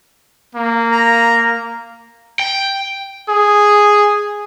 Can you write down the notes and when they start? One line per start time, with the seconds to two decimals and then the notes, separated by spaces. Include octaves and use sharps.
0.55 A#3
0.91 A#5
2.40 G5
3.29 G#4